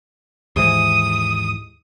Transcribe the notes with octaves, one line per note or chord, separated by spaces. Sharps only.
D#2 G#2 E3 D#6